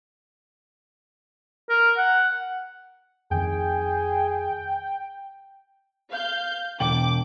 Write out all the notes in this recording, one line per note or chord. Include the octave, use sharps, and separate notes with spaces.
A#4
F#5
F2 D#3 G#4 G5
F5 G6
E1 G5 D6 F#7